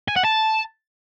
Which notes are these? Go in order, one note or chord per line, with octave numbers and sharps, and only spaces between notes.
G#5
F#5
A5